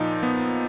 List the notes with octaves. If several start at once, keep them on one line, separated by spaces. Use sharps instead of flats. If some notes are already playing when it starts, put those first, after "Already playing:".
Already playing: A#2 F3 D#4
B3